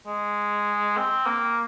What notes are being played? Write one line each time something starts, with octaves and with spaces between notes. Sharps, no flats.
G#3
C4
A#3